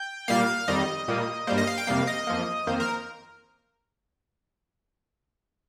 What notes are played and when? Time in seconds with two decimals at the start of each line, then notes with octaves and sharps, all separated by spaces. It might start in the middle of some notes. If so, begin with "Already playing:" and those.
Already playing: G5
0.28 A#2 G3 A#3 F5
0.68 F2 D#3 G3 D#5
1.08 A#2 G3 A#3
1.47 G2 G3 A#3 C5
1.58 D#5
1.67 F5
1.78 G5
1.87 F2 C3 G3 A#3 F5
2.07 D#5
2.27 F2 F3 A#3
2.67 F2 D#3 A#3 C5
2.80 A#4